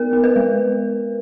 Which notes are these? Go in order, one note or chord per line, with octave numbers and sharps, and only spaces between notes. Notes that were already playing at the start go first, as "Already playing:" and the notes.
Already playing: B3 A#4
B3
B4
G#3